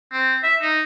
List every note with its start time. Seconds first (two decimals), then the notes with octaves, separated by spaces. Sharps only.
0.12 C4
0.43 E5
0.62 D#4